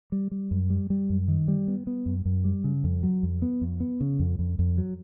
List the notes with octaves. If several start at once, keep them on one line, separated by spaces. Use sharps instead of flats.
G3
G3
F#2
G3
G3
F#2
D#3
G3
B3
B3
F#2
F#2
G3
C#3
F2
F#3
F2
B3
F2
B3
C#3
F2
F2
F2
F#3